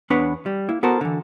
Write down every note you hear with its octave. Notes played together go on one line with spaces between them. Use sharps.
E2 B3 D4 B4 C#5 F#5
G3
A#3 E4
B3 F#4 A4 A#4 C5
D3 E3